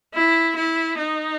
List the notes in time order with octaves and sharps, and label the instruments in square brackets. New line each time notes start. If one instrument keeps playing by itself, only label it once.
[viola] E4
E4
D#4